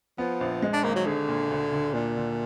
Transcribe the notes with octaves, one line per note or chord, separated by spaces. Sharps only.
F3 B3
A#1
G#3
D4
G#1 A#3
F#3
D3 G#4
A#2
D2
D2
A#2 D4
D3